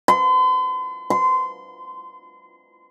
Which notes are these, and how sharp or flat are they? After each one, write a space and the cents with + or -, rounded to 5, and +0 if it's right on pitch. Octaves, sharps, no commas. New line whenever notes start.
C6 -45
C6 -25